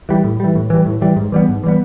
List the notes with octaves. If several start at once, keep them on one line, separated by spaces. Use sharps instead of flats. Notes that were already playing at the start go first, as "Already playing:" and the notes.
E3 G3
A2
E3 G3
A2
E3 G3
A2
E3 G3
G#2
E3 G3 B3
G#2
E3 G3 B3